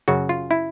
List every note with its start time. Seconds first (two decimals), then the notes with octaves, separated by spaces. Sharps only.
0.08 F#2 C#3 F#3 F#4
0.29 F4
0.51 E4